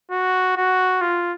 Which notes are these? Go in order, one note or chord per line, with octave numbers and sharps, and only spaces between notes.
F#4
F#4
F4